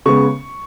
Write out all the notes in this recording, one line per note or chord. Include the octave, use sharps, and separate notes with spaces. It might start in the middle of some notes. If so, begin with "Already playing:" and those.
C#3 G#3 B3 C#6